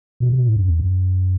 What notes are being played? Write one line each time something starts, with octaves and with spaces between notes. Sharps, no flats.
B2
C3
B2
A2
F#2
E2
F#2